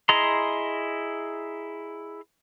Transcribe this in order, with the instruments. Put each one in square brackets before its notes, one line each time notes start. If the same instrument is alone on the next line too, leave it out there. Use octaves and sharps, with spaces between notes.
[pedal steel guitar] E4 G#4 D#5 A#5 C6